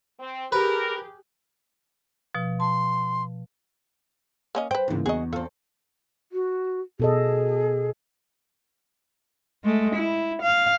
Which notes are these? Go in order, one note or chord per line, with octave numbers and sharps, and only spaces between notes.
C4
G4 G#4 A#4 B4
B2 F3
A5 C6
A#3 C#4 D#5
B4 C5 G5
D2 G#2 C#3 E3 A#3
E2 F#4 G#4 D#5
C4 F4 A4
F#4
B2 G#4 A4 D#5
G#3 A3
E4
F5